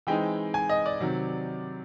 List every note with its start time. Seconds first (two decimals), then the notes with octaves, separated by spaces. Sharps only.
0.07 E3 G#3 C4 D#4 G5
0.54 G#5
0.69 D#5
0.86 D5
1.01 C3 D#3 F#3